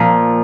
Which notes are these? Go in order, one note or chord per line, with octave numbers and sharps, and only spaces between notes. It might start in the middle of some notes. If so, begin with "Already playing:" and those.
Already playing: A#2 F3